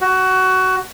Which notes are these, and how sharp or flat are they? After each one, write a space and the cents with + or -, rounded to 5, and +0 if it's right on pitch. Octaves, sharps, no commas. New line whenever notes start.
F#4 +20